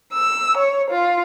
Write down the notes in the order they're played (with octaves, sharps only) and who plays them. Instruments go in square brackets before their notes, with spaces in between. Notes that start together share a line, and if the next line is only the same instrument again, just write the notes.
[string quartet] E6
C#5
F4